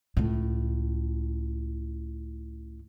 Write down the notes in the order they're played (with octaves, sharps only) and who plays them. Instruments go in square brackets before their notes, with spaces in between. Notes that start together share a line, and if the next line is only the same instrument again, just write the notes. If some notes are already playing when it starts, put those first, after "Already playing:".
[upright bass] C#2 A2